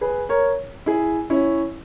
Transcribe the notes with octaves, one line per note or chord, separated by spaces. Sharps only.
G#4 B4
A#4 C#5
E4 G#4
C#4 E4